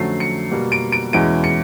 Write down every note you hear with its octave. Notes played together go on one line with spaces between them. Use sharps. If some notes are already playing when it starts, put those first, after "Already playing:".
Already playing: F2 D3 F#3 A3 C#4 C7
C#7
B2 G3 A#3
D7
D7
E2 B2 G#3 C#4 E4 D7
C#7